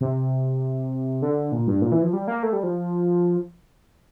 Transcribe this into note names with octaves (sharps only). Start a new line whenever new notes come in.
C3
D3
A#2
G2
A#2
E3
F3
G3
A#3
A3
G3
F3